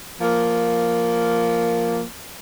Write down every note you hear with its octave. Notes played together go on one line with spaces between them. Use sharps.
F3 A#3